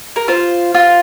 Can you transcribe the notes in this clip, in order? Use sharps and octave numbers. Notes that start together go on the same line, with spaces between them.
A#4
F4 C5
F4